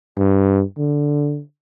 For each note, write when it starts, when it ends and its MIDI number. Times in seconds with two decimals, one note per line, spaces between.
0.18 0.63 43
0.78 1.41 50